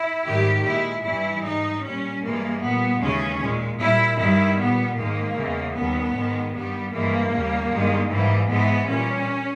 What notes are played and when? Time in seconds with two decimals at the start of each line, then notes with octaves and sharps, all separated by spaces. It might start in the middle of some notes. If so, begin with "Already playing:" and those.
Already playing: E4
0.27 G#2 D#3 G3 G4
0.66 A#2 G#3 E4
1.05 G2 E3 G3 E4
1.44 G#2 G3 D#4
1.83 A#2 G3 C#4
2.22 G2 E3 G#3 A#3
2.61 A#2 G3 B3
3.01 D#2 C#3 E3 G#3 C#4
3.40 A#2 G#3
3.79 A#2 G3 E4
4.18 G2 D#3 G3 E4
4.58 A#2 G3 B3
4.96 G#2 D#3 G#3 A#3
5.36 E2 C#3 E3 G#3
5.75 D#2 D#3 G3 B3
6.14 G#2 D#3 G#3
6.53 G2 G3 B3
6.92 G2 E3 G#3 A#3
7.32 D#2 C#3 G3
7.70 G2 D#3 G#3
8.09 G#2 E3 G3 A#3
8.48 G#2 E3 G#3 B3
8.88 A#2 G3 C#4